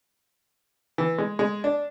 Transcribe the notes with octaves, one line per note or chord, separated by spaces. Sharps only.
E3
G#3
G#3
D4